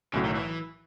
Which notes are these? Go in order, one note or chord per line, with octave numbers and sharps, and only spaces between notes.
B1 A2 C#3 F#3
D#3
E3